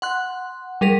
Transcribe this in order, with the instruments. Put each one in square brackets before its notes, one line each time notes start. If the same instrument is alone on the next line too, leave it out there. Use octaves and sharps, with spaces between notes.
[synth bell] F#5 C6 F#6
G3 G#4 A#4 B6